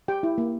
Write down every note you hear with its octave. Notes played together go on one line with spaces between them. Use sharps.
G4 G5
E4
A#3